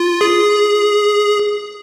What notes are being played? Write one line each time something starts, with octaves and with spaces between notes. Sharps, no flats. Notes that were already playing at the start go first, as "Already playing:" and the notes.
Already playing: F4
G#4